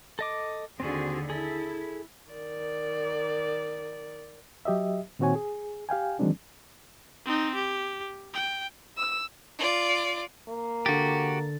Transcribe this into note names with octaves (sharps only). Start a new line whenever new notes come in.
A4 D#5 D6
D#2 D3 C4 F#4 G#4
E4 G#4 A4
D#3 D5
F#3 G4 D#5 E5
A#2 D#3 C4 F#4 C#5 G#5
G#4
G4 F5 G5 G#5
D#3 E3 F#3 G#3 C4 D4
C4 D#4
G4
G5
E6
F4 D5
A#3
D3 F#4 G4 A6